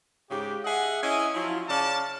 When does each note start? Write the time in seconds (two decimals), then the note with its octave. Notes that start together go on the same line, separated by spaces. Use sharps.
0.29 G#2 C#3 G4
0.64 G#4 D#5 E5 F#5
1.01 C#4 E4 D#5 G#5
1.34 F3 F#3 E4 F4
1.68 C#3 C#4 D5 F5 A5